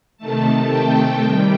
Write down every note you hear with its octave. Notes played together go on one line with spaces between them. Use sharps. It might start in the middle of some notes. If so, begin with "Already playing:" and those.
C3 D#3 A3 A5
G5
C3 D#3 G3